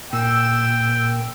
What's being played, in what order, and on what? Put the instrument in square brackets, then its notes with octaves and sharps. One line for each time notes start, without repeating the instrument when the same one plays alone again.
[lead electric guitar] A#2 [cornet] G5 [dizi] E6